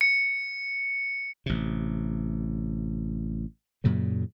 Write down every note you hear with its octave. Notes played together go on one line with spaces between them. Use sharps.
C#7
A1 C3
F#2 A#2 C#3 F#3